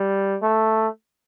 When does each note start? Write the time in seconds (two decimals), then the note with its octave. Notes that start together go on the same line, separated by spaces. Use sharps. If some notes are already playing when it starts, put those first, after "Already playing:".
Already playing: G3
0.43 A3